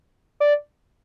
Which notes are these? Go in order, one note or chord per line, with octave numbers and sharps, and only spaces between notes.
D5